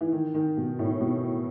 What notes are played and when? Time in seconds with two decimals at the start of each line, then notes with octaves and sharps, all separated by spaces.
0.01 E3
0.13 D#3
0.34 D#3
0.57 B2
0.79 A2
1.01 B2